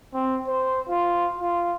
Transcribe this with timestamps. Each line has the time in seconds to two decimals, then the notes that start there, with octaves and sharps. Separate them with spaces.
0.14 C4
0.48 C5
0.89 F4
1.39 F4